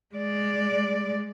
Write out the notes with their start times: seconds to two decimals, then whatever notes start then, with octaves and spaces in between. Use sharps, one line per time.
0.15 G#3 D5